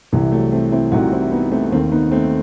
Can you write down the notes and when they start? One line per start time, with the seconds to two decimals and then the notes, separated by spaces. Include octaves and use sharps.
0.12 C2 C3 E3
0.32 F#3 A3
0.52 A3 C4
0.72 C4 E4
0.92 C2 C3 E3 D#4 F#4
1.12 C4 E4
1.32 B3 D#4
1.52 A3 C4
1.72 D#2 D#3 A3 C4
1.92 B3 D#4
2.11 A3 C4